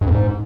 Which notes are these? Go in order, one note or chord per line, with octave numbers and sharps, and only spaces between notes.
G2
F2
G#2